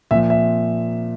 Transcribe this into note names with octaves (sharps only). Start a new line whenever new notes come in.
A#2 F3 E5
E5